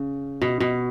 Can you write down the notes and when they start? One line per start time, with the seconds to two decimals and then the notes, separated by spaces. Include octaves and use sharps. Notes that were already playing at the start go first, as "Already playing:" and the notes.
Already playing: C#3
0.42 B2
0.60 B2